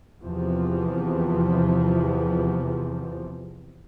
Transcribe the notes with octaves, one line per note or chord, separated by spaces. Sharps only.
E2 C3 F3